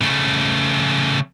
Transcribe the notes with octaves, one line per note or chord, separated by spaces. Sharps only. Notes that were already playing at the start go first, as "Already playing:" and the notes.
C#3 A3